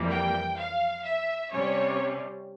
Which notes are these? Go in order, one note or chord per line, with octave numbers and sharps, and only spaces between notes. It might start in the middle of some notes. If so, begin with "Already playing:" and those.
Already playing: F2 E3 G3 A#3
G5
F5
E5
C3 G3 C#4 C#5